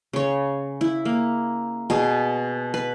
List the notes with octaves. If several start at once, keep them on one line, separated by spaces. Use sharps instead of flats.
C#3 C#5
E4
A#3
B2 G#4
B4